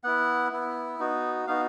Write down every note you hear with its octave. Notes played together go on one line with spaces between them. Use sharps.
B3 E4 F#5
B3 E4
B3 D#4 F#4
B3 D#4 F#4 F5